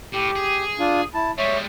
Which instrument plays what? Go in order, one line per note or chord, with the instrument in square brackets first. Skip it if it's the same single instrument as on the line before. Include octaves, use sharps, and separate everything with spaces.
[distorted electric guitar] A2 [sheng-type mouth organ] G4
[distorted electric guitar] G#4
[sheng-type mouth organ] D4 F4
E4 A5
[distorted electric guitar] G3 G#3 [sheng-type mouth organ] C#5 E5